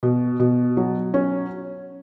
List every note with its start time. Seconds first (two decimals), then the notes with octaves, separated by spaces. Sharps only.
0.03 B2
0.40 B2
0.77 F#3
1.14 C#4